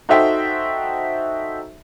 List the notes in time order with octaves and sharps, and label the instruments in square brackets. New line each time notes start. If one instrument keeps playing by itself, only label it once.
[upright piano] D#4 F#4 A4 C5 E5 G5